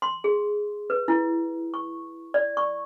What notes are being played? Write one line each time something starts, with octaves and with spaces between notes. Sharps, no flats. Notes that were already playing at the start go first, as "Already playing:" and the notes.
C6
G#4
B4
E4
C#6
D5
C#6